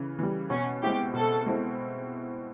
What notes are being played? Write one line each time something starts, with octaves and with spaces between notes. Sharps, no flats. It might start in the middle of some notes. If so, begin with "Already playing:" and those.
Already playing: C#3 E3
E3 G3
B2 C#4
G#3 C4 E4 G4
B2 A4
G#3 C4 E4